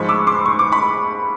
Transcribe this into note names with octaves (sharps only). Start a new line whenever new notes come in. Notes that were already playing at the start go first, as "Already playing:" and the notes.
Already playing: G#2 F3 G#3 B5 C#6
D6 E6
C6 D6
C#6
D6
B5 C#6